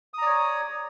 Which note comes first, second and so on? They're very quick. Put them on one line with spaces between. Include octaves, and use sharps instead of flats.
D#6 A#5 D5 C#5